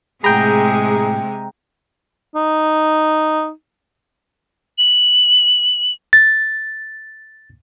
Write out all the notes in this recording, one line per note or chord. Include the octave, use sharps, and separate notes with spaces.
A2 C3 G#3 G#4 F#5 G5 A#5 B5
D#4
F#7
A6